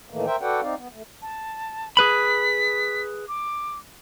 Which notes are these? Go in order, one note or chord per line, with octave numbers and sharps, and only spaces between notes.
A2 D#3 E3 A3 A#3
A#4 C5 E5 G5
F#4 A4 B4 D5 F#5 G5
C4 D#4 D5 F5
B3
A3
A5
G#4 B4 B5 B6
D6